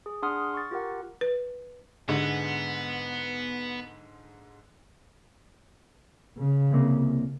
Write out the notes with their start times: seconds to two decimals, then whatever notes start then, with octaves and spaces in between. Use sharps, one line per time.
0.06 G#4
0.23 D4 G#4 F#5 C6 D#6 F6
0.54 C#6 A6
0.71 F4 G4 A#4 F#5
1.21 B4
2.09 G#2 D3 G#3 B3
6.38 C#3
6.71 C2 C3 A#3